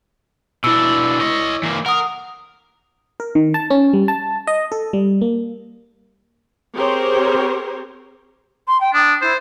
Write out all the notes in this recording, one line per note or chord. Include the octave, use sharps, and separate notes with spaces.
B2 D4 E4 E6
C#5 D#5
E3 A#3
A#4 F#5 D#6
A#4
D#3
A5
C#4
G3
A5
D#5
A4
G3
A#3
C4 G4 G#4 A#4 C5 C#5
C6
G5
D4 D#6
E4 C5